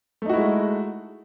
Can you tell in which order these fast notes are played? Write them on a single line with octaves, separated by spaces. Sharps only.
A3 D#4 F#4 E4 G#3